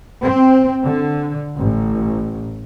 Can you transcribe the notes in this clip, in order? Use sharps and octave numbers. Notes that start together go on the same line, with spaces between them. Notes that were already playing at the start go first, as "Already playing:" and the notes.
C4
D3
A1